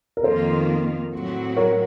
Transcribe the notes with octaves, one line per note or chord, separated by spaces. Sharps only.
A#4
F2 D#3 A#3 F4 A4 C5
A2 F#3 C4 F#4
A#4 C#5